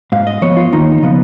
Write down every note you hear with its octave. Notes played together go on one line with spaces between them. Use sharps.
G#2 F5
D#5
F3 B3 C#5
F4
D#2 D#4
C#3 F3 B3